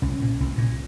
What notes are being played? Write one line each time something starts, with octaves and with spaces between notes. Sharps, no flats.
C2 C#4
A#2
C2
A#2